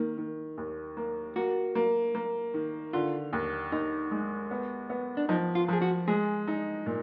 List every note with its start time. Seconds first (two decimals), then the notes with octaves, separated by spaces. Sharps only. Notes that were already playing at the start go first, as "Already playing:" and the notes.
Already playing: D#3 A#3
0.18 D#3
0.57 D#2
0.97 A#3
1.36 A#3 F#4
1.75 A#3
2.15 A#3
2.54 D#3
2.93 D3 F4
3.33 D#2
3.72 D#2 D#4
4.11 G#3
4.51 B3
4.90 B3
5.17 D4
5.29 F3 D#4
5.55 F4
5.68 F3 G#4
5.82 F#4
6.08 G#3 G#4
6.48 D#4
6.86 A#2